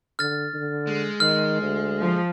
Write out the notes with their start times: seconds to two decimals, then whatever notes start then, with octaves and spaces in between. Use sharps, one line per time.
0.19 D3 F6 A6
0.53 D3
0.87 G#3
1.20 D#3 F6
1.62 D2
2.00 F3